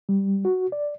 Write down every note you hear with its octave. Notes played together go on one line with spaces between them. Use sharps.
G3
F#4
D5